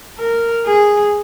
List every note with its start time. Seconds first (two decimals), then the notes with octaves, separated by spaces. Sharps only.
0.18 A#4
0.66 G#4